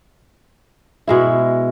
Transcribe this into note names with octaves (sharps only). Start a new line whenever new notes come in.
B2 G#3 E4